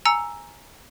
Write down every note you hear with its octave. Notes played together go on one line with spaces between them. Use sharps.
G#5 A#5 E6 C#7 D#7